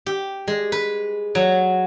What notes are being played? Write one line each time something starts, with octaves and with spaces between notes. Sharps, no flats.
G4
G#3
B4
F#3